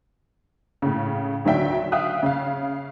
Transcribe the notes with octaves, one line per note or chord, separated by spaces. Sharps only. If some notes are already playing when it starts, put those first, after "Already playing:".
A2 C#3
D2 D#3 F#3 D4 E5 G5
E5 F5 G5 D#6 F#6
C#3 F5